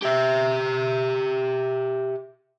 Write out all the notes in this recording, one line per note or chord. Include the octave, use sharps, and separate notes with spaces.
G4 E5